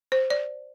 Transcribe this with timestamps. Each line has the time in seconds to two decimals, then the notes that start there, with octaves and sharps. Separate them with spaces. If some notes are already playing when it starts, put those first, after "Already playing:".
0.12 C5
0.30 D5